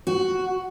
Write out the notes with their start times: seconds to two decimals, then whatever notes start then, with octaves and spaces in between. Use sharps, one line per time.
0.07 F#4